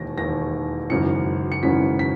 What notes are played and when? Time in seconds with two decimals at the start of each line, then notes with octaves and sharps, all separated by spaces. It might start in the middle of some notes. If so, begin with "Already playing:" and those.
Already playing: E1 D#2 D#3 A#6
0.18 E1 D#2 D#3 A#6
0.90 G#1 F#2 C#3 E3 C#7
1.52 C#7
1.63 G#1 F#2 C#3 E3 B6
1.99 B6